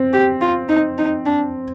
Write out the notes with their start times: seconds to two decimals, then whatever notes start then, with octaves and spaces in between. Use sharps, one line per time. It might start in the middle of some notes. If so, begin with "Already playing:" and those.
Already playing: C4
0.13 G4
0.41 F4
0.69 D#4
0.98 D#4
1.26 D4